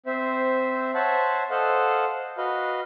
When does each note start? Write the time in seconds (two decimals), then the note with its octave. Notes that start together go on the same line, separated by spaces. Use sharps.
0.06 C4 C5 E5
0.95 C5 C#5 E5 F#5 A5
1.51 A4 C5 D#5 F5 F#5
2.38 F#4 B4 D#5 F5